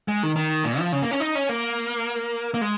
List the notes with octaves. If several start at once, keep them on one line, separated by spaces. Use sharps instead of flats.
G#3
D#3
D#3
A#2
F3
C#3
A#3
C#4
D#4
C#4
A#3
A#3
G#3